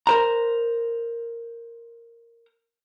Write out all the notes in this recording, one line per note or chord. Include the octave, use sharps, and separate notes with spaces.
A#4 C5 A#5